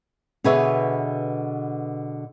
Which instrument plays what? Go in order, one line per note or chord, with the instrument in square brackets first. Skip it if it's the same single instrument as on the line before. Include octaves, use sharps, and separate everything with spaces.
[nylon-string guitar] B2 D3 G#4 B4 C#5 E5